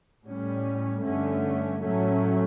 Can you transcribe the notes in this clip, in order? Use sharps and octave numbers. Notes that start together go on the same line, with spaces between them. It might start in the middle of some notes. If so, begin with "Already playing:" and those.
A2 G3 C#4
G2 D3 A3 C#4
A2 F#3 A3 C#4